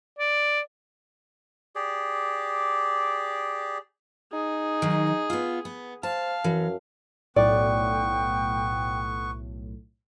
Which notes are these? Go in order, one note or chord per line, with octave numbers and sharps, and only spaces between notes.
D5
G4 G#4 D5
D#4 G#4
D#3 F#3
B3 F4
B3
C5 F5 A5
F#2 E3
B1 A2 B3 D5 G5 C#6